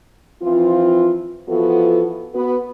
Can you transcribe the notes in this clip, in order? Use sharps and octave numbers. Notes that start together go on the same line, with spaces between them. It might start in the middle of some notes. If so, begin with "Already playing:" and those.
E3 F3 C4 F4
E3 F3 B3 F4 F#4 A4
B3 F#4 B4